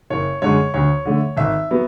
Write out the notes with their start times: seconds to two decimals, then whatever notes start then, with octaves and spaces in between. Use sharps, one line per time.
0.10 F#1 C#5
0.42 F#2 D3 G#3 C#5
0.74 D2 C#5
1.06 D3 A3
1.37 G#1 E5
1.71 F#3 B3